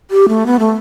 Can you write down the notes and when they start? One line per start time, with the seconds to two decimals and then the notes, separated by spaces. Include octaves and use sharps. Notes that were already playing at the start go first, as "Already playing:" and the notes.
0.11 G4
0.28 A3
0.46 B3
0.59 A3